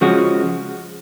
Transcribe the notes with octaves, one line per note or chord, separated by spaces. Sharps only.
C#3 F3 G#3 C#4 F#4